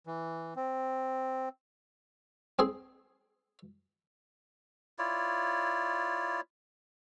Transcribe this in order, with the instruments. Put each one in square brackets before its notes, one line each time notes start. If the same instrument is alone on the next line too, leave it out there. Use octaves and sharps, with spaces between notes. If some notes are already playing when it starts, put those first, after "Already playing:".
[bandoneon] E3
C4
[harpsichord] C4 G#4 C6
[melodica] E4 F4 C#5 D5